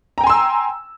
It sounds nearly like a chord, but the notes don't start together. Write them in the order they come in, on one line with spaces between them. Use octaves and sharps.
A#5 G5 G#5 C6 E6